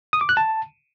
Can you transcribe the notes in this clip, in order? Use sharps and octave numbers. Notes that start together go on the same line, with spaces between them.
D#6
D6
F#6
A5